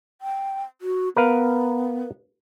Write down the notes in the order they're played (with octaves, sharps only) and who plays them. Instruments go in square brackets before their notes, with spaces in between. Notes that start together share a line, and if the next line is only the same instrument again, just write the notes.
[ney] G5
F#4
[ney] B3 [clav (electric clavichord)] A#4 B4 F5